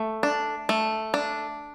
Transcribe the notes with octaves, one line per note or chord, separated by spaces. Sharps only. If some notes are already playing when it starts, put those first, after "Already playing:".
Already playing: A3
D4
A3
D4